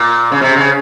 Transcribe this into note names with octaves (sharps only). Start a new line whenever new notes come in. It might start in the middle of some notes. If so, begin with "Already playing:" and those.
Already playing: A#2
C#3
C3
C#3